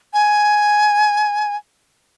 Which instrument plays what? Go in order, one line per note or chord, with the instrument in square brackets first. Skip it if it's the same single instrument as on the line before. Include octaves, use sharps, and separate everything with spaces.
[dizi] G#5